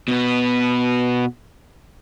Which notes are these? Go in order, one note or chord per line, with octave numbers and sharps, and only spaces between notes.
B2 B3